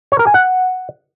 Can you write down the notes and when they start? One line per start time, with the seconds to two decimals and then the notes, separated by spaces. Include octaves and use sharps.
0.12 C#5
0.19 A#4
0.27 G#5
0.34 F#5